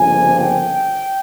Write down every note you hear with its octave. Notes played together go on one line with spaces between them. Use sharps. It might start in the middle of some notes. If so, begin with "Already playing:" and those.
Already playing: G1 F2 C#3 F3 A#3 G#5
G5